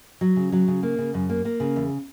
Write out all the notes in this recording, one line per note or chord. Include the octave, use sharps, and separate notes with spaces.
F#3
C#3
F#3
C#3
A#3
C#3
F#2
A#3
A#3
C#3
E2